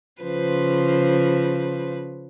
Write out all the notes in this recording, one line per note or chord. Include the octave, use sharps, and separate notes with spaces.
C#3 F3 B4 C5